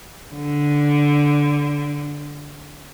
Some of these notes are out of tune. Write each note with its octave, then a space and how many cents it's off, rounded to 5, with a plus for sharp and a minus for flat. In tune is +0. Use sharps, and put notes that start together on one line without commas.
D3 -5